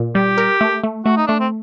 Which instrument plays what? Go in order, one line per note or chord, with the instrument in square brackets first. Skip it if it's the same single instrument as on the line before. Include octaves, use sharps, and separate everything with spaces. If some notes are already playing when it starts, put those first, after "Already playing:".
Already playing: [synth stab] A#2
[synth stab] G3 [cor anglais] G4
[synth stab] A#4
A3
A3
[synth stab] A3 [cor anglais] F#4
[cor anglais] D#4
[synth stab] A3 [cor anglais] D4
[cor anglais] C4